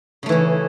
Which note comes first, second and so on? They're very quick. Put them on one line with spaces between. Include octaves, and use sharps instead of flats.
C#3 A3 E3 C#4